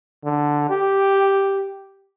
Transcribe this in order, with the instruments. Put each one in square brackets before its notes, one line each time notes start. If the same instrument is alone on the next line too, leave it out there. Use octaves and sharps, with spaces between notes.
[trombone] D3
G4